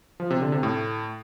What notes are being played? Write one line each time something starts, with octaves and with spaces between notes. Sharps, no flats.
F3
C3
D3
C3
A2